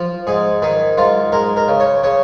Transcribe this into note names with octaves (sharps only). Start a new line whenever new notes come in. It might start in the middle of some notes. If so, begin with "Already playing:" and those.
Already playing: F3
G#2 G#4
D#3 G#4
G#2 F4
G#3 A#4
A#4
C#3
C#5
C#3 C#5